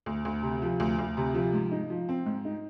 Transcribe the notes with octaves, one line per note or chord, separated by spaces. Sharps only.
D2
D2
C3
F3
D2
D2
C3
F3
G#2
D#4
F3
C4
G#2
D#4